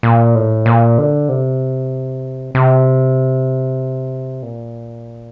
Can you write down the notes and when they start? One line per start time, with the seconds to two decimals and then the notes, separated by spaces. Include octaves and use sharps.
0.03 A#2
0.35 A2
0.66 A#2
0.98 D3
1.29 C3
2.55 C3
4.43 A#2